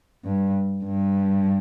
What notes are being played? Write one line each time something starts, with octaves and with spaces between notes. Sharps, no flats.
G2
G2